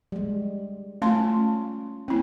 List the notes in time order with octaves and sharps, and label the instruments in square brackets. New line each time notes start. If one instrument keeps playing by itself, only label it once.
[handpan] G3 G#3
[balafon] A3 A5 C6 [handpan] C#4 F4
[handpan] A#3 C#4 [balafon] C4 E4